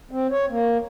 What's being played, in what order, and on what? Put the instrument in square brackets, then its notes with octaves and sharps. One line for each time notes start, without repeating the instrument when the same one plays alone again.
[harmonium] C4
C#5
A#3